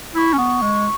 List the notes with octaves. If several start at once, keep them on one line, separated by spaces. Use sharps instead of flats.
E4 C#6 E6
C#4
B3
G#3